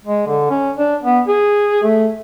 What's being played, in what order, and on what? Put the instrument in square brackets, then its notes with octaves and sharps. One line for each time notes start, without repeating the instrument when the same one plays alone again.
[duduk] G#3
D3
C#4
D4
B3
G#4
A3